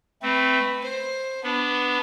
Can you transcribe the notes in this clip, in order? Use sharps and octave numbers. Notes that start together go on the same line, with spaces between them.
A3 C4 B4
C5
B3 D4 B4